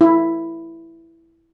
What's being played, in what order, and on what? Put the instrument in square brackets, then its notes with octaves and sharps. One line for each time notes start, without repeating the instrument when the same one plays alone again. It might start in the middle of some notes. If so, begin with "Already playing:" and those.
[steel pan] E4